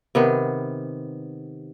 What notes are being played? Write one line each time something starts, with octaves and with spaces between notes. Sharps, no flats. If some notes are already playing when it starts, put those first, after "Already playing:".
C3 D#3 B3